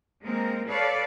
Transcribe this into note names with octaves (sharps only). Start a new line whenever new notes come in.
G#3 A#3 C4 A#4
A4 B4 C#5 D5 F5